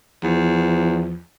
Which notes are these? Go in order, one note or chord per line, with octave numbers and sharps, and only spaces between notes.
E2 F3